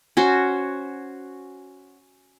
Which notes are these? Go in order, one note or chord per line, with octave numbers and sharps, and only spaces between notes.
C#4 F#4 C5